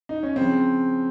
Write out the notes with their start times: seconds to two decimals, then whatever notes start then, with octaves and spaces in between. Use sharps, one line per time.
0.09 D#4
0.23 C#4
0.36 C#3 F3 C4